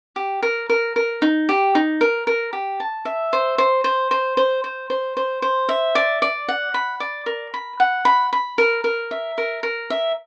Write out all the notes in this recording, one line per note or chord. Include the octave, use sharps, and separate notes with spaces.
G4
A#4
A#4
A#4
D#4
G4
D#4
A#4
A#4
G4
A5
E5
C5
C5
C5
C5
C5
C5
C5
C5
C5
E5
D5
D5
F#5
B5
D5
A#4
B5
F#5
B5
B5
A#4
A#4
E5
A#4
A#4
E5